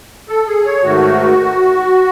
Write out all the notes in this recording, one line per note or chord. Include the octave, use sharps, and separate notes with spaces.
A4
G#4
C#5
G#2 D#3 A3 F#4